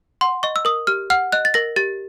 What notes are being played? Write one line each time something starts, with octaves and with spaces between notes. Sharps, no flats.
F#5 C6
D#5 C#6
E6
A#4 D#6
G4 F6
F#5 F6
D#5 F#6
A6
A#4 A#6
G4 A6